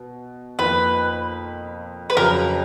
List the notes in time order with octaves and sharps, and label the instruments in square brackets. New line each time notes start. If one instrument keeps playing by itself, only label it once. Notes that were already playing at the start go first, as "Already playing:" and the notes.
Already playing: [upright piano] B2
[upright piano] F2 D#3 A#3 F4 [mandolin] B4
[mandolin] B4
[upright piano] F2 C#3 F#3 [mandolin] A#4